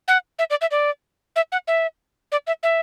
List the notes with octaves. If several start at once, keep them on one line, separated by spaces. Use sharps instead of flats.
F#5
E5
D5
E5
D5
E5
F#5
E5
D5
E5
E5